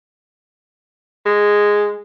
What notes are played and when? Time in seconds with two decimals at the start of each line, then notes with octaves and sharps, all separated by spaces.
1.26 G#3